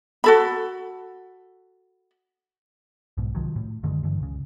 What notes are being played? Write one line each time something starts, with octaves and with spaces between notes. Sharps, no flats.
F#4 A4 B5
B1 G#2 B2
C2 D#3 F3 F#3
A2
F#2 D3 D#3 G#3
G2 D3 E3
C#2 C#3